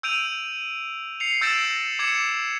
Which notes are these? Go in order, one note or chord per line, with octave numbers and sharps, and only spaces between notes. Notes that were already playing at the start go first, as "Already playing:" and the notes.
E6 G6 D7 D#7 F7
C7 C#7 F7
E6 G6 A6 A#6 D7 E7
D6 G#6 C#7 E7